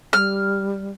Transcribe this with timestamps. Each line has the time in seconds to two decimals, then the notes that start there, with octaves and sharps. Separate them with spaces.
0.13 G3 F6